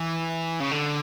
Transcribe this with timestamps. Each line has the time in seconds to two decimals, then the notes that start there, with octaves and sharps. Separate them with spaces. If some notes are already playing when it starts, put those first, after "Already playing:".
Already playing: E3
0.60 C#3
0.71 D3